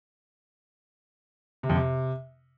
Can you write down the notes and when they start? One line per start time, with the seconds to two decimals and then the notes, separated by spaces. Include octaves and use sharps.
1.63 C3
1.69 F2
1.76 C3